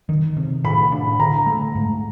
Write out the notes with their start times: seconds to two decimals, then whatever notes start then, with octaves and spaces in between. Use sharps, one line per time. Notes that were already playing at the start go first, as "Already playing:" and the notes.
0.09 D#3
0.37 C3
0.64 A2 B5
0.92 D4
1.19 D3 A#5
1.46 A3
1.75 G#2